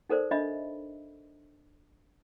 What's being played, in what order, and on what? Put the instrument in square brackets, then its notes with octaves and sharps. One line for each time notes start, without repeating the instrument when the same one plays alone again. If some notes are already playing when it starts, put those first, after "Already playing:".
[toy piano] D#4 A4 A#4 C5 D5
D4 D#5 E5 B5